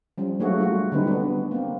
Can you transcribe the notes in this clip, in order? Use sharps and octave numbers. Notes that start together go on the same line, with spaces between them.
F3 G3 C#4
F#3 A3 A#3 D4 F#4 G#4
G3 F4 F#4
D3 F#3 G3 C4 D#4 B4
B3 D4
A#3 C4